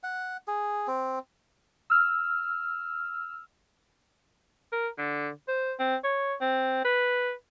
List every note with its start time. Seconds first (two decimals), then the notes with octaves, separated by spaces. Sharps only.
0.03 F#5
0.48 G#4
0.87 C4
1.90 E6 F6
4.72 A#4
4.98 D3
5.48 C5
5.80 C4
6.04 C#5
6.41 C4
6.85 B4